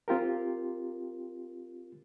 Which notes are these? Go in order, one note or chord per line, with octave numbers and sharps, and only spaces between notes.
C4 F4 G4 A#4